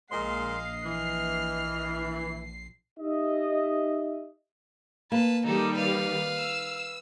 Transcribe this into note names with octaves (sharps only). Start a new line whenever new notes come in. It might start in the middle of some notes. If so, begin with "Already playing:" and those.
A#1 A#2 G#3 D#5 F5 C6 C7
E3 F6
D#4 G4 D#5 E5
A#3 B4 A5
D#3 G3 D#4 A4
B4 F5
E6